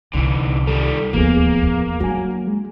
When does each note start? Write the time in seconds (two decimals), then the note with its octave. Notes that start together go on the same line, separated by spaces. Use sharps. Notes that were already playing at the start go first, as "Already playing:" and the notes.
0.13 C2 D3 E3
0.67 D#3 G3 A4
1.13 D1 D#2 F3 A#3 B3 G#4
1.62 E2
2.00 F#3 D4 F#4 G#5
2.47 G#3